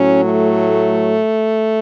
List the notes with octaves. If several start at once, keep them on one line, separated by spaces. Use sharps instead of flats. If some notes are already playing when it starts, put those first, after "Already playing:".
Already playing: A2 F#3 C#4
A3